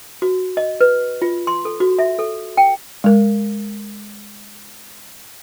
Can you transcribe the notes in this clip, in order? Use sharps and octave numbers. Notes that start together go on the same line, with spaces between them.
F#4
D#5
B4
F4
C6
A4
F#4
E5
A4
G5
G#3 A#4